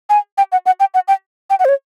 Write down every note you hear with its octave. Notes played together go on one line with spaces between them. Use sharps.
G#5
G5
F#5
F#5
G5
F#5
G5
G5
F#5
C5
C#5